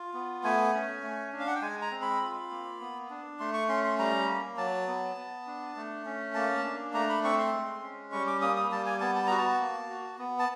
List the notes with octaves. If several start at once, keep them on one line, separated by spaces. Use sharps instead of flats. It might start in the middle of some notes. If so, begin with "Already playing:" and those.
Already playing: F4
B3
A3 G#5
C#4
A3
D4
F5
F#5
G5
G#3 G#5
A#5
C4
B5
F4
A#3
B3
D4
A3 C6
C#6
C#4 C6
C6
G3 A#5
A#3
F#3 A5
B3
B3
D4
A3
C#4
A#3 A5
D4
A3 A#5
B5
C4 C#6
C6
G#3
C#4
G3 C#6
D6
A#3 D#6
D#6
G3 A5
G#5
B3 A5
A5
F#4 A#5
A5
A#3
F#4
B3
A5